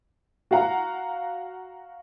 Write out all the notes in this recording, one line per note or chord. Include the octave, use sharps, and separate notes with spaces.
F#4 F5 F#5 A#5